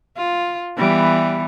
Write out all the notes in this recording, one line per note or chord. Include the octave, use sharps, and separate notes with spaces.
F4
E3 G3 B3